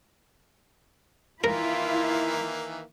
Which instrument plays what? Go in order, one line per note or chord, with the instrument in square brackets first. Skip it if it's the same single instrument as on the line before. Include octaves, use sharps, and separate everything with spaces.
[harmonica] D#3 E3 A#3 [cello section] E4 [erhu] F4 [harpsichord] A#4